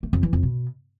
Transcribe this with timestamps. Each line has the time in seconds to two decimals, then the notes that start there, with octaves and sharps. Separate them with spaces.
0.03 A3
0.13 F2
0.23 E3
0.33 F2
0.43 B2